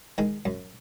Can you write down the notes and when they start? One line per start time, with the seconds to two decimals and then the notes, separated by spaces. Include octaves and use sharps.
0.18 D#3 G#3
0.45 F#2